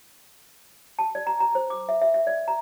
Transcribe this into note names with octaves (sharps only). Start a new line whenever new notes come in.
A5
D5
A#5
A#5
C5
D6
E5
E5
E5
D5
A#5